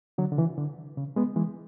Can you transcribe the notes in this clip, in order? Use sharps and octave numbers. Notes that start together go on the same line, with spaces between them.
D3 F#3
D3
C#3 E3
D3
C#3
G#3 B3
E3 G#3